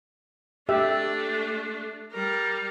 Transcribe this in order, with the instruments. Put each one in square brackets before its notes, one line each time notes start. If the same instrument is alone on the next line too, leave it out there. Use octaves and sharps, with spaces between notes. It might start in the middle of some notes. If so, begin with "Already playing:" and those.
[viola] A3 D4 [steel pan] G4 E5
[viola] G3 A#4